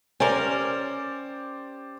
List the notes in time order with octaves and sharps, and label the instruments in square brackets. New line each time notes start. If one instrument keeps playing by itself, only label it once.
[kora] C#4 A#4 [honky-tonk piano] G4 C5 D5